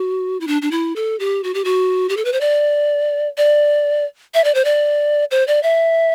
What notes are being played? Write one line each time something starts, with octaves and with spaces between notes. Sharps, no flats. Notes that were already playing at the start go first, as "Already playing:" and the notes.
Already playing: F#4
E4
D4
D4
E4
A4
G4
F#4
G4
F#4
G4
A4
B4
C5
D5
D5
E5
D5
C5
D5
C5
D5
E5